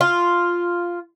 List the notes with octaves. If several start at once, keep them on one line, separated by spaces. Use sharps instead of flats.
F4